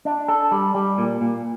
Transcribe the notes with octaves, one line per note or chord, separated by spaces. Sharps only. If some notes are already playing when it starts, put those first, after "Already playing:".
D4
A4
G3
G3
A#2
A#2